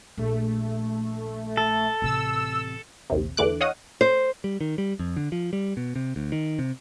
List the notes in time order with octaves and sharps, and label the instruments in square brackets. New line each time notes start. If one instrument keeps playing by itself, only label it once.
[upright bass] A#1 [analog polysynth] A3
[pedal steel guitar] A4
[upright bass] A1 C3 [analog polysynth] E6
[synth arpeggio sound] A#1 D#2 C3
E2 D3 E3 A3 D6 F#6
C#5 D#5 F5 F#5 D#6
[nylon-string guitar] C5
[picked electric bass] G3
D#3
G3
F2
D3
F3
G3
B2
C3
D2
D#3
C3